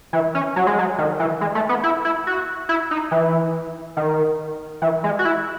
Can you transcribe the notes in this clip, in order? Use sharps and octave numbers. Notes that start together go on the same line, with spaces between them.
E3
C#4
F#3
G#3
F#3
D#3
E3
G#3
A3
B3
E4
E4
F#4
E4
D#4
E3
D#3
E3
G#3
F#4
E4